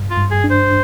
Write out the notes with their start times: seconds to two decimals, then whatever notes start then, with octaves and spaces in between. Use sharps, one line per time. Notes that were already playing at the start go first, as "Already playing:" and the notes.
Already playing: G2
0.10 F4
0.17 G2
0.31 G#4
0.44 D4
0.50 C5